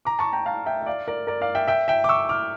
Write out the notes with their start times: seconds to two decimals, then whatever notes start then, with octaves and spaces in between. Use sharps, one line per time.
0.05 A#5 D6
0.19 A5 C#6
0.33 G5 A#5
0.46 F5 A5
0.66 E5 G5
0.82 E5
0.86 D5 F5
1.08 A#4 D5
1.27 A#4 D5
1.41 D5 F5
1.55 E5 G5
1.68 E5 G5
1.88 E5 G5
2.04 D6
2.09 C#6 E6
2.29 D6 F6